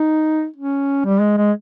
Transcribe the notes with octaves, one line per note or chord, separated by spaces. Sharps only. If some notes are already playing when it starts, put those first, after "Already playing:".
Already playing: D#4
C#4
G3
G#3
G#3